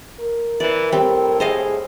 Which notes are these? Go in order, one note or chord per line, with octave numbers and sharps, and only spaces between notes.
A#4
E3 D5
A2 G3 C4
G#4 C5 D#5 F5